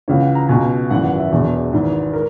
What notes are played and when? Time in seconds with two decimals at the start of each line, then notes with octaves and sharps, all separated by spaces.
0.08 C#2 C#3 E3 C#5
0.21 F#5
0.35 A#5
0.49 C#2 B2 G#5
0.90 G#1 F#2 E3 F#5
1.04 F#5
1.18 E5
1.32 E1 E2 B2
1.73 G#1 G#2 E3
2.13 A#4